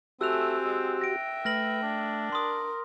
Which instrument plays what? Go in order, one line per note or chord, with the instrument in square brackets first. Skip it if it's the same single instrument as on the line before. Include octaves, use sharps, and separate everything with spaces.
[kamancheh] A3 G#5 [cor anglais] C4 [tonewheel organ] F#4 G4 [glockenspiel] E6 F#6 F7
[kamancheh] G#3
[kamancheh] E5 G5 [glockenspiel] A#6 D7
[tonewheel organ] A3 [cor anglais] B4 [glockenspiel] F6 A#6 F#7
[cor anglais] D4
[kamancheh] A#4 [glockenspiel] C6 D#6